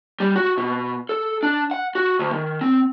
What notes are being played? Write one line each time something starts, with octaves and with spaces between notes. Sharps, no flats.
G3
F#4
B2
A4
D4
F#5
F#4
D2
D#3
C4